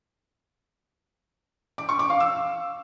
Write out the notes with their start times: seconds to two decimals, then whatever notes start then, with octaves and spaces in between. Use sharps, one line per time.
1.78 D6
1.89 C#6
1.99 D6
2.10 F5
2.20 E6